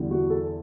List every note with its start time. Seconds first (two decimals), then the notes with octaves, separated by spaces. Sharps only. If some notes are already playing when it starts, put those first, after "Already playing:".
Already playing: E2 D3 G3
0.11 F#4
0.30 A4